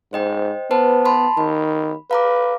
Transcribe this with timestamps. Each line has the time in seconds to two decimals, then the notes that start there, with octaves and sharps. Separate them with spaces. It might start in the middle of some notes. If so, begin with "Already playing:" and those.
0.13 G#2 C5 D#5 G5
0.71 B3 B4 C5 A5
1.05 A5 B5 C6
1.37 D#3 B5
2.11 B4 F5 A#5 D6